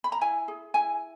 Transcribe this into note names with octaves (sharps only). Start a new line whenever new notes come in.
B5
A#5
E4 G#5
G#4
E4 G#5